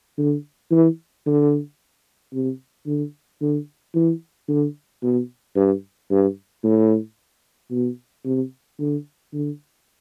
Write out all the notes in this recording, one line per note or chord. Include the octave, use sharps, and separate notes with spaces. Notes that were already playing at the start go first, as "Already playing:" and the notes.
D3
E3
D3
C3
D3
D3
E3
D3
B2
G2
G2
A2
B2
C3
D3
D3